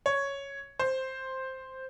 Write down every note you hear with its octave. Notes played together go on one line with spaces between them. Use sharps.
C#5
C5